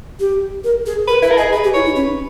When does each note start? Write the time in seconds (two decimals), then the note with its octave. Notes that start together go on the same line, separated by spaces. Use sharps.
0.19 G4
0.64 A#4
0.86 G#4
1.07 A#4 B4
1.22 E4 B4
1.31 A#4
1.37 G#4 D#5
1.52 G#4 B4
1.64 G4
1.74 E4 C#5
1.86 D#4
1.96 C#4 B4